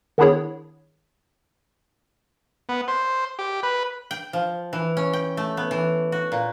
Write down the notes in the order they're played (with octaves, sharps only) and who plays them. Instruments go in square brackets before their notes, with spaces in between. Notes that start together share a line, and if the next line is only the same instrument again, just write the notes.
[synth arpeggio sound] D#3 B3 D4 E4 G#4 C#5
[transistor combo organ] B3
C5
G4
B4
[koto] G5
F3
E3
C#4
G5
A3
B3
E3
F#4
A#2